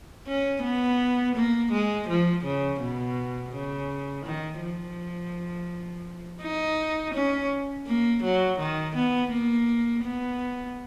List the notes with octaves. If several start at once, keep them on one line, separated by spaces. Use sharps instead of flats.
C#4
B3
A#3
G#3
F3
C#3
B2
C#3
D#3
F3
D#4
C#4
A#3
F#3
D#3
B3
A#3
B3